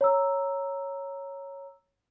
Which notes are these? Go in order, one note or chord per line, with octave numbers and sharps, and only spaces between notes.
C#5 A#5 E6